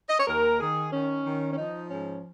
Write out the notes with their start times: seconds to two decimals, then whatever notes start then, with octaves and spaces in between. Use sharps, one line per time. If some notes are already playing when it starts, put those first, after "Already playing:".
0.09 D#5
0.19 C#5
0.27 D#2 A#4
0.60 D#3 G#4
0.93 D#3 C#4
1.25 D#3
1.52 C#4
1.57 F3 D#4
1.90 G#2 C#4